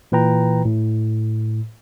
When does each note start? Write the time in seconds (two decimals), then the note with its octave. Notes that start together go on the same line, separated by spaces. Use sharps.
0.12 A#2 E3 B4 G5 A#5
0.65 A2